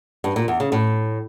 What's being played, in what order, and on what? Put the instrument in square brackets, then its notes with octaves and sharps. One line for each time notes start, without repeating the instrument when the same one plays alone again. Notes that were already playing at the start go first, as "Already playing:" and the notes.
[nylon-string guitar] G2
A#2
E2
C#3
A2